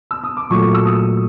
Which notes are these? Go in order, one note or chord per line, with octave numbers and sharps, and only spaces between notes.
E6
D#6
D6
A#2 F#3 A3 C#6
E6
D#6